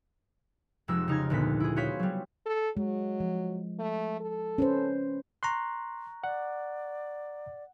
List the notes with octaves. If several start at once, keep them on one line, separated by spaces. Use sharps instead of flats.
F1 F2 G#3 E6
C#3 D#4 F6 G#6
D2 A#2 B3 B6
E4 G#4
F#4 G#4 C5 C#5 F5 B6
F#3 G3
A4
F#3 G#3
F3
A3
A4
C#4 B4 C5
A#5 C6 C#6 F#6
D5 F#5